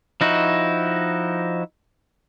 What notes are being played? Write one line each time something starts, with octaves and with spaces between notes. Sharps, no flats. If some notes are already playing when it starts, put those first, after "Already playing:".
F3 D#4 E4 F#4